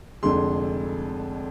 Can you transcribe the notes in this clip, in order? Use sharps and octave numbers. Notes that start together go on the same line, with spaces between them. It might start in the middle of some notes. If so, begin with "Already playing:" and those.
F1 F2 D3 G#3 C6